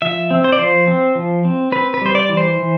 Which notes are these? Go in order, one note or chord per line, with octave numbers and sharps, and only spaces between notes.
F3 E5
C4
C5
D5
F3 C5
C4
F3
C4
C4 B4
B4
G3 C5
D5
E3
C5
E3